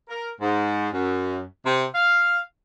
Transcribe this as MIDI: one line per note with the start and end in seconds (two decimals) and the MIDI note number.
0.09 0.30 70
0.41 0.88 44
0.93 1.43 42
1.65 1.85 48
1.95 2.38 77